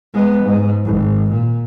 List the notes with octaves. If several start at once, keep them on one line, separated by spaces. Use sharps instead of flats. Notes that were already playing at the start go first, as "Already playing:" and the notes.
G#3 B3
G#2
G#1
A#2